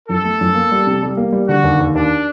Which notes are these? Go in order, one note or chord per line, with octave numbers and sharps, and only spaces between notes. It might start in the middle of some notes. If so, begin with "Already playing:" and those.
F#2 A4
A3
F#2
A#3
G3
C3
G3
A#3
G3
D3 F#4
D#2
D#2
D#2 D4